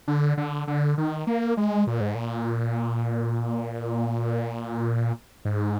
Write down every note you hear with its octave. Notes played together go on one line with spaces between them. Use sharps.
D3
D3
D3
D#3
A#3
G#3
A#2
G#2
A#2
G#2